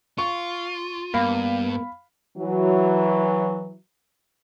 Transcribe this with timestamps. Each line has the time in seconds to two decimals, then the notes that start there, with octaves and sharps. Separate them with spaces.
0.18 F4 C#6
1.14 G2 A#3 B3 F5 B5
2.38 E3 F#3